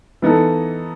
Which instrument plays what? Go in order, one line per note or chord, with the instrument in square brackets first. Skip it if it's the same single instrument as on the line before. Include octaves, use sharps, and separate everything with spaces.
[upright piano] E3 B3 D#4 A4